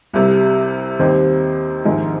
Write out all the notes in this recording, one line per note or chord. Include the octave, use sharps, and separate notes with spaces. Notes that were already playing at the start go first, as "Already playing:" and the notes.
C2 C3 G3
D#2 D#3 G3 C4
A#1 G#2 D#3 G#3